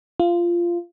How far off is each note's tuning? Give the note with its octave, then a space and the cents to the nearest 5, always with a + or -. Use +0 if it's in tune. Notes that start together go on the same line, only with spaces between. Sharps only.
F4 -15